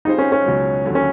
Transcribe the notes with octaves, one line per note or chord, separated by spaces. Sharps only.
G3 C4 D#4 F4 G#4 C5
C#4
C#4
C#2 B2 F#3
D#2 D3 F#3
C#4